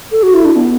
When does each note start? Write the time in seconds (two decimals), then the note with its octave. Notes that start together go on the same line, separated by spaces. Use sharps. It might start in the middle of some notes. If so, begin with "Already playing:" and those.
0.12 A4
0.23 F#4
0.34 E4
0.45 D4
0.56 B3